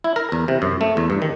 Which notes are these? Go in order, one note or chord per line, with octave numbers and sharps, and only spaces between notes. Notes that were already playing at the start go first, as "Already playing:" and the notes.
E4
A#4
E2
C3
F#2
A3
E2
G2
D#3